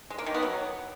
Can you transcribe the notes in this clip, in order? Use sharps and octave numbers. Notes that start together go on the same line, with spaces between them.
G#3
A#3
D#3
B3
F#3